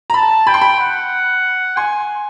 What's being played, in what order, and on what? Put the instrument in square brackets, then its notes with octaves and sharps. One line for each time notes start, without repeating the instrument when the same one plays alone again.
[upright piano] A#5
[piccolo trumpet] A5 [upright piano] B5
[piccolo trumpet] G5 [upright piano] B5
[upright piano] C6
B5
[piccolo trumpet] F#5
[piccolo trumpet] G#5 [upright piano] C6